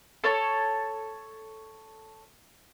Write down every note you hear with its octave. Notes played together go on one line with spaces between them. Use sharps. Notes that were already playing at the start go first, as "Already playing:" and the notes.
A4 C#5 A5